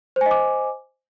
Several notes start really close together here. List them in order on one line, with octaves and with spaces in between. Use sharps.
C5 G#5 D#5 D6